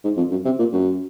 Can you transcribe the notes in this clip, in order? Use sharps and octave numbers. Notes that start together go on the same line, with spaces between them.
G#2
F2
F#2
C3
A#2
F#2